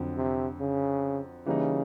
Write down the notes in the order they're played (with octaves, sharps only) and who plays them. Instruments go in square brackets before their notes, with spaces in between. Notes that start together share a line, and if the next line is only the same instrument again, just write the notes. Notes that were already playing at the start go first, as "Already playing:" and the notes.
Already playing: [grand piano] F2 D3 F#3
[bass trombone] C3
C#3
[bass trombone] C#3 [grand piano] E3 G3 A#3 D#4